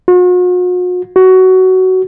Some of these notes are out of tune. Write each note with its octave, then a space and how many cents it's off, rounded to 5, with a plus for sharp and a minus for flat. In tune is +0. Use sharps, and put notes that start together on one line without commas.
F#4 -45
F#4 +15